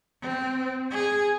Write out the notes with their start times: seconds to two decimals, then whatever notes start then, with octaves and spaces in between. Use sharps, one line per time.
0.22 C4
0.91 G#4